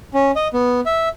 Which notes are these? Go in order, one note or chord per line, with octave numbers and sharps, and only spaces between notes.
C#4
D#5
B3
E5